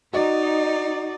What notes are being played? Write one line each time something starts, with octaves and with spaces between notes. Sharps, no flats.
D#4 F#4 D5 D#5